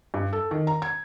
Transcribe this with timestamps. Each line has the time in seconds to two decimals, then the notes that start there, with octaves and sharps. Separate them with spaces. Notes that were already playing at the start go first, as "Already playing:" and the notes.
0.14 G2
0.33 A4
0.51 D#3
0.67 A#5
0.82 G#6